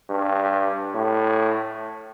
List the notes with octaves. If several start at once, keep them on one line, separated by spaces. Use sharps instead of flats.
G2
A2